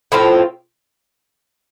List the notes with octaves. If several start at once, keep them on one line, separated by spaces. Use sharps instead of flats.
A2 F3 C4 F4